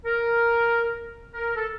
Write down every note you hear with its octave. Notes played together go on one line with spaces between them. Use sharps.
A#4
A#4
A4